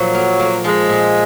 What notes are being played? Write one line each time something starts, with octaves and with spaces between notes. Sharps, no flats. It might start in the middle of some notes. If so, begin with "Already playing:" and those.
Already playing: A#2 F3 F#3
A#3
A#3
F3 G#3
A#2